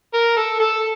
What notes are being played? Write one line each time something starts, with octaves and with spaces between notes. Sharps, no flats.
A#4
A4
A4